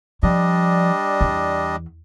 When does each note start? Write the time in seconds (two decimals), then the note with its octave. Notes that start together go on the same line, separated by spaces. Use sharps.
0.23 F3 G3 D4 D#5
1.21 E2